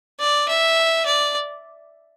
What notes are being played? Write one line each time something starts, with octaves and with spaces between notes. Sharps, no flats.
D5
E5
D5